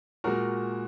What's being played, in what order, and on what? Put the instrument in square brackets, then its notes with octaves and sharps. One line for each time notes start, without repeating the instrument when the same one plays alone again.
[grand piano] A#2 G#3 F#4 A#4